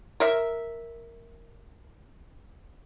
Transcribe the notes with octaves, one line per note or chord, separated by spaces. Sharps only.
A#4 E5